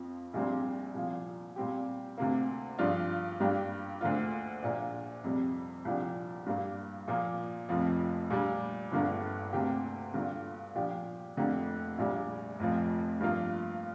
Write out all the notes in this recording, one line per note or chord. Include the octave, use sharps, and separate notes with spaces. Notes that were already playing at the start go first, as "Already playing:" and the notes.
Already playing: F2 F3 C4
A#1 A#2 G3 C4
C2 A#2 F3
A#2 G3 C4 G4
D2 C3 A#3
G2 F3 D4 F4
G2 G3 A#3 D4 G4
D2 D3 A#3 F4
A#1 A#2 A#3 D4
F2 C3 G3
C2 A#2 F3 D4 G4
G2 G3 A#3
A#2 F3 A#3
F1 F2 F3
A#2 G3 D4
G1 G2 D3 A#3
D2 C3 A#3 G4
G2 D3 A#3 F4
A#2 F3 D4 G4
F1 F2 D3 A#3 G4
A#1 A#2 G3
F1 F2 F3
G2 F3 A#3 F4